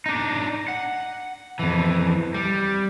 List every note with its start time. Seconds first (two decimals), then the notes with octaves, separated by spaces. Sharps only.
0.06 D4 D#4
0.68 F#5
1.59 F2 E3
2.34 G3